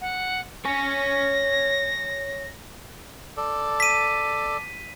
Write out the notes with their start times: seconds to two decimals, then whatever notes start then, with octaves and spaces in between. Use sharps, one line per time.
0.01 F#5
0.65 C#5 G#5 A#6
3.37 A4 D5
3.80 B6 D#7